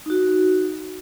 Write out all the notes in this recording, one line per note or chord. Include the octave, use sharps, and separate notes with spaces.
D#4 F#4